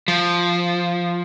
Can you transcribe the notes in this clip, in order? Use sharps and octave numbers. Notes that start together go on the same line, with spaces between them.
F3